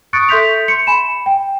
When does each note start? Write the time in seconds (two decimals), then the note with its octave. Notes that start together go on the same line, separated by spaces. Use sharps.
0.13 C#6 D#6 F#6 A6 C#7 D7
0.29 A4 E5 C6 G6 B6 F7
0.68 C6 C#7
0.87 G#5 B5 E7
1.26 G5